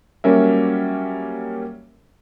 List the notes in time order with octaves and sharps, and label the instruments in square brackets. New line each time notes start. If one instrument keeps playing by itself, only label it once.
[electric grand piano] F#3 G3 A#3 C#4 A#4 E5